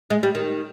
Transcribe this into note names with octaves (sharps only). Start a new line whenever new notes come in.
G#3
G3
D#3